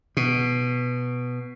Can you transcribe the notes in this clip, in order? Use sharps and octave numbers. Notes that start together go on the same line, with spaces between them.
B2